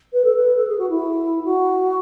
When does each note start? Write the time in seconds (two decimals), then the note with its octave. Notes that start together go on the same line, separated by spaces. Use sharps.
0.13 B4
0.24 A4
0.35 B4
0.56 A4
0.67 G#4
0.78 F#4
0.89 E4
1.44 F#4